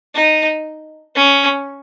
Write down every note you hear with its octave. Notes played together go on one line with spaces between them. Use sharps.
D#4
C#4